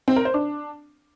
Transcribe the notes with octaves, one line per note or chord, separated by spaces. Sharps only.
C4
A#4
C5
D4